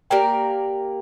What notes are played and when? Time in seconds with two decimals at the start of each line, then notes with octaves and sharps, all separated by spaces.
0.10 A#3 G4 A#4 D5 G5